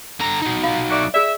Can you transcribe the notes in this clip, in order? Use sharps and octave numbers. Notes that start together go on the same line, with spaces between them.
D3 A#5
F#3 D#4
F4 F5
A3 F#4 D5
G#4 D5 E5